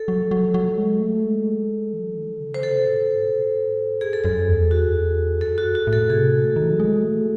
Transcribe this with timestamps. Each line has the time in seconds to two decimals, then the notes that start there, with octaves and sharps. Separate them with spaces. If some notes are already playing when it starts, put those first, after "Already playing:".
Already playing: A4
0.08 F#3
0.31 F#3
0.54 F#3
0.78 G#3
1.00 A3
1.24 G#3
1.93 E3
2.01 F#3
2.09 E3
2.17 D#3
2.40 C#3
2.54 C5
2.63 C3 A4
2.86 A2
3.09 G#2
3.25 C3
3.32 A2
4.01 F#2 G#4
4.13 A4
4.24 F#2 G#4
4.48 E2
4.71 F#4
5.40 F#2 A4
5.58 F#4
5.75 F#4
5.87 A2
5.93 A4
6.10 C3 G#4
6.44 A3
6.56 D#3
6.64 E3
6.72 F#3
6.80 G#3
7.03 A3